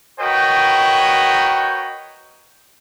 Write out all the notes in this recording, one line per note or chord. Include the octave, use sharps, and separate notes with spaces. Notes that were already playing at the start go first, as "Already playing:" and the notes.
F#4 A#4 B4 C#5 D#5 G5